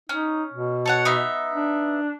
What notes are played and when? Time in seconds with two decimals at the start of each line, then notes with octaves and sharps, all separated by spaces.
0.09 C#4 D#4
0.54 B2
0.86 A4 C#5 F#5
1.05 B3 D#4 E5
1.54 D4